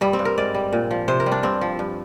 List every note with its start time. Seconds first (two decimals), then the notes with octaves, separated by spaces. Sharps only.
0.01 G2 G3
0.13 C4
0.19 G2
0.25 A#4
0.38 G#2 D5
0.55 G3
0.73 A#2
0.91 F3
1.08 C3 C5
1.20 A#4
1.26 G3
1.32 D4
1.43 G2 C4
1.61 F3
1.79 G2